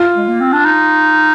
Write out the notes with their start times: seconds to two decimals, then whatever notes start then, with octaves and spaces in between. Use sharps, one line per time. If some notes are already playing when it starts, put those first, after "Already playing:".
Already playing: F4
0.16 G#3
0.28 A#3
0.41 C4
0.53 D4
0.66 D#4